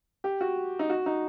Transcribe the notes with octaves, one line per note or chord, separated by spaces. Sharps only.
G4
F#4
D#4
F#4
D#4